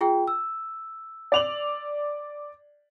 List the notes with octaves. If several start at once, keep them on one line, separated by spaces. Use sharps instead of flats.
F4 G#4 G5
E6
D5 F7 F#7